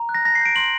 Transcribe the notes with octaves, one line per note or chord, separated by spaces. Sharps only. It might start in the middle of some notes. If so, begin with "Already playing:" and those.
Already playing: A#5
F#6
A#6
A5 A#6
C7
G6 D7
C6 F#7